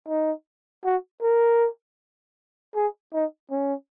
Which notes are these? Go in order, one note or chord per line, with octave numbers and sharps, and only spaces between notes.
D#4
F#4
A#4
G#4
D#4
C#4